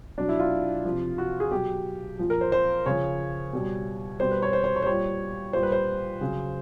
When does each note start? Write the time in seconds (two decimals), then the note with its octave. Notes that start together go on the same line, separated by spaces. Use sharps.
0.18 B2 F#3 D4
0.29 E4
0.39 F4
0.85 C3 F3
1.18 F#4
1.40 G#4
1.51 B2 F#3 G4
2.19 A#2 F3
2.30 A#4
2.41 C5
2.52 C5
2.86 C#3 F3 C#5
3.53 B2 G3
4.20 B2 G3 C5
4.31 B4
4.42 C#5
4.53 C5
4.64 C5
4.76 C#5
4.82 C5
4.86 A#2 G3 C#5
5.53 A#2 G3 C5
5.63 B4
5.72 C5
6.21 C#3 F#3